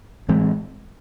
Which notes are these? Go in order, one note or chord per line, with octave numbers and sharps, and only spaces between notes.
A2 E3 G#3 C4